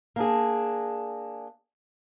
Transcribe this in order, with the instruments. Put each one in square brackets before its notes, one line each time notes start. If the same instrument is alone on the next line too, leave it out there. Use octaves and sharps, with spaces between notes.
[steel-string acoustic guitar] A#3 D4 G#4